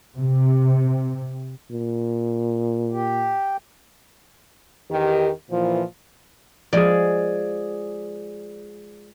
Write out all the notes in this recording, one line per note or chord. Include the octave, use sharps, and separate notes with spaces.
C3
A#2
G4
E2 D#3 G4
A#2 E3 F3
F3 G#3 G#4 D5